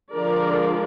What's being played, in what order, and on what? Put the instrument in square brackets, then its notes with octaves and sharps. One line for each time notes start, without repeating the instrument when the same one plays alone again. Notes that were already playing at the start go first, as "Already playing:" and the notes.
[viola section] D3 F3 G#3 D4 A#4 D5